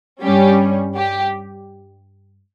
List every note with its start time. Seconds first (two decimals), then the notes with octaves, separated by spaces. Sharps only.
0.22 G2 G3 C#4 G4
0.96 G4